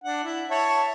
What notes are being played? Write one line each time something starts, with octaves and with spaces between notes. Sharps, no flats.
D4 F#5
E4
C#5 E5 A5